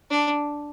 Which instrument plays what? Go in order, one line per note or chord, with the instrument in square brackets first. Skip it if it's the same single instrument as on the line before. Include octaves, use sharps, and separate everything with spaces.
[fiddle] D4